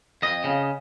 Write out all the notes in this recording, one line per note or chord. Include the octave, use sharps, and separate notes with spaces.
F2 D#5
C#3